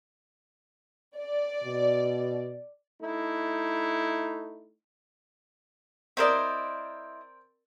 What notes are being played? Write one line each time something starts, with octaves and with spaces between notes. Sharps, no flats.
D5
B2
A3 D#4 E4
C4 E4 A#4 C5 D5 D#5